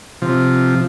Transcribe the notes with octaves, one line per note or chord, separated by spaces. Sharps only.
C3 F3